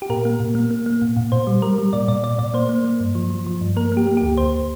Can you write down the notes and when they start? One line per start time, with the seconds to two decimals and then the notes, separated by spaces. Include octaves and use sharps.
0.02 G4
0.09 A#2 A#4
0.25 A#3
0.40 A#2
0.55 A#3
0.71 A#3
0.86 A#3
1.02 A#2
1.17 A#2
1.32 A#2 C5
1.47 G3
1.62 G3 A#4
1.78 G3
1.93 A#2 D5
2.08 A#2 D5
2.23 A#2 D5
2.38 A#2 D5
2.54 A#3 C5
2.69 A#3
2.85 A#3
3.00 G2
3.15 F3
3.30 F3
3.46 F3
3.61 G2
3.76 A#3 A#4
3.92 A#3
3.97 G4
4.07 A#3
4.17 D2 G4
4.37 D2 C5